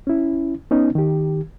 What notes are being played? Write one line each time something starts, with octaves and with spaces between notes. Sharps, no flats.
C#4 E4
B3 C#4 D#4
D#3 G4